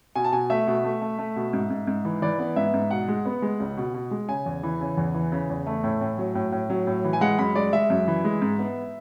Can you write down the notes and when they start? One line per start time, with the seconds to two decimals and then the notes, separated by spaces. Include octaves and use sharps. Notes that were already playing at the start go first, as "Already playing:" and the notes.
0.15 B2 G#5
0.24 A5
0.32 B2 G#5
0.50 A3 E5
0.67 B2
0.84 A3
1.02 A3
1.19 A3
1.36 B2
1.53 G#2
1.70 G#2
1.87 G#2
2.05 E3
2.22 E3 D5
2.39 B3
2.56 G#2 E5
2.74 G#2
2.91 B2 F#5
3.08 G#3
3.26 B3
3.42 G#3
3.60 C#2
3.77 B2
3.94 B2
4.11 G#3
4.28 C#3 G#5
4.46 E2
4.63 E3
4.80 C#3
4.97 E2
5.14 E3
5.32 C#3
5.49 E2
5.67 A3
5.84 A2
6.01 A2
6.18 F#3
6.35 A2
6.52 A2
6.70 F#3
6.87 A2
7.04 E3
7.13 G#5
7.21 G#3 F#5
7.39 F#2 B5
7.55 G#3 D5
7.73 G#3 E5
7.90 F#2
8.07 E3
8.25 G#3
8.42 G#2
8.59 B3